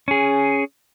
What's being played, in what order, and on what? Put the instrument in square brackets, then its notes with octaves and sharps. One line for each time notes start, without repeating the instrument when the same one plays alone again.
[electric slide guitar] C#4 G#4